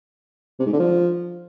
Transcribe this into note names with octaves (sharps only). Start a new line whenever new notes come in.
C3
G#2
D3
F3